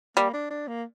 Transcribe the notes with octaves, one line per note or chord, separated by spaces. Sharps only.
G3 A#3
D4
D4
A#3